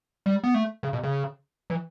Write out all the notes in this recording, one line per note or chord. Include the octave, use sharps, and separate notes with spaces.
G3
B3
A3
C#3
B2
C#3
E3